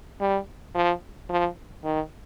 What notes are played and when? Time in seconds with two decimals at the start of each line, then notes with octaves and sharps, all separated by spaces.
0.21 G3
0.75 F3
1.29 F3
1.84 D#3